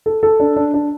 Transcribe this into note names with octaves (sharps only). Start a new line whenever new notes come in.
A4
A4
D4
D4
D4